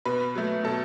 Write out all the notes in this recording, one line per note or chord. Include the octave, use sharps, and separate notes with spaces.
B2 B4
F#3 A3
B2 A4